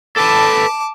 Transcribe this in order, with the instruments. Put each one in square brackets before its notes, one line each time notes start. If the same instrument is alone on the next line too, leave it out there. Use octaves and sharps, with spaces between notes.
[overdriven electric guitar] A4 B4 [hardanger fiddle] A5 D6